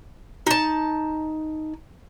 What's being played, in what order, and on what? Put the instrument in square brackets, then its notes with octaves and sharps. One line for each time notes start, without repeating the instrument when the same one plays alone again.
[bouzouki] D#4 A5